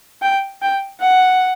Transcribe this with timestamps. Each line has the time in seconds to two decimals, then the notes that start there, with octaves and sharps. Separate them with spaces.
0.22 G5
0.62 G5
1.01 F#5